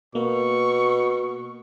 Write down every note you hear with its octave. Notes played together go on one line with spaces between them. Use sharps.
B2 A#3 C#6